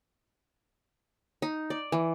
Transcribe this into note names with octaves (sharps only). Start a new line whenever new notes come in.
D#4
D5
E3